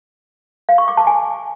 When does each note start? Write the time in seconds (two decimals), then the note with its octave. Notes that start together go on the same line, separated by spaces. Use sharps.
0.69 F5
0.78 C#6
0.88 D6
0.97 A5
1.07 G#5